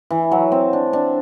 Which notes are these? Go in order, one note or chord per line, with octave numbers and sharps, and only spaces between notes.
E3
F#3
C4
D4
D4